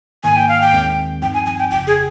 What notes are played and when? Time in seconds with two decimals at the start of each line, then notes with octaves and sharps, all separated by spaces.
0.24 G#2 D#3 A#3 G#5
0.36 G5
0.49 F5
0.61 G5
0.73 D#2 D#3 G#3 C4
1.22 G2 F3 C4 D#4 G5
1.34 G#5
1.46 G#5
1.59 G5
1.71 G1 F2 C#3 G5
1.87 G#4